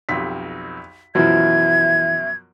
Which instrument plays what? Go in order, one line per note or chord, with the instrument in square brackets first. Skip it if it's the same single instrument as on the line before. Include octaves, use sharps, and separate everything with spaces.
[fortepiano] B1 F2 G4 [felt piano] B6
[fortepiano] F#2 B2 F3 [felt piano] E3 [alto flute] E5 [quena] G#6